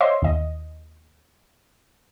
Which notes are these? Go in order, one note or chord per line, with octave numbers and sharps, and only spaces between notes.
C5 C#5 D#5 E5 C6
D#2 D#5